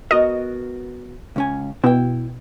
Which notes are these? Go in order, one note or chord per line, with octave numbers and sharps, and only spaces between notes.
B3 F#4 A#4 D#5
C#2 C#4 G#5
B2 E4 G5